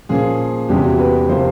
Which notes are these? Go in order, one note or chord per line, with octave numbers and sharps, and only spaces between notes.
A#2 F3 A#3 C#4 G#4
E2 C3 E3 G#3 C#4 G4
F#4
B4
C3 F3 A#3 C5